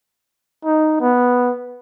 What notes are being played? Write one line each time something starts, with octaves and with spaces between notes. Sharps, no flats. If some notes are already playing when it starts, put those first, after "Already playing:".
D#4
B3